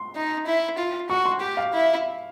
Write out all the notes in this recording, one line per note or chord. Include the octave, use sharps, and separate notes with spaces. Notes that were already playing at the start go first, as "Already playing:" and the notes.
Already playing: C6
D#4
E4
F4
F#4 C#6
C6
G4
F5
E4